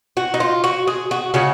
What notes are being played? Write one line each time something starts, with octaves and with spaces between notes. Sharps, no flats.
F#4
D#4
F4
F#4
G#4
F#4
C#3 G#3 F#4